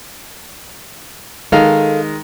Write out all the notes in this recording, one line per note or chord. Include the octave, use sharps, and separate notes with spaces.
D#3 G#3 A4 F5